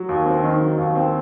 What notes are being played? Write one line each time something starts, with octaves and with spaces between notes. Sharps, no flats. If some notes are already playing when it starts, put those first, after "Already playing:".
Already playing: F#3
D#2
C4
D#3
F#3
D#2
C4